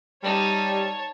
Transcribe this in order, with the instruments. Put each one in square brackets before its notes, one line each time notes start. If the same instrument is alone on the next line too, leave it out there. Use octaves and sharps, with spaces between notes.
[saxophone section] G3 [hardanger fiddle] D#4 [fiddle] C#5 A5